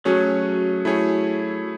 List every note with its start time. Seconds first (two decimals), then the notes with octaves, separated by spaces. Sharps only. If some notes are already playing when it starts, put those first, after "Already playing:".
0.05 F#3 A3 C#4 G#4 C#5
0.85 A3 E4 G#4 C#5